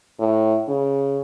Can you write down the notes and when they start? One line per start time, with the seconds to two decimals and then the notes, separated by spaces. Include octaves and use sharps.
0.20 A2
0.68 C#3